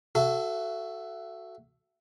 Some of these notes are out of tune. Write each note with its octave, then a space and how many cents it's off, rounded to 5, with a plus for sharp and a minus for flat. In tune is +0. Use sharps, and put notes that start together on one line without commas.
F#4 +0 A4 +0 E5 +35